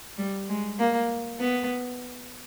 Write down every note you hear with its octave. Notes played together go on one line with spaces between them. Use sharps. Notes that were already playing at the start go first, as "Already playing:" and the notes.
G3
G#3
A#3
B3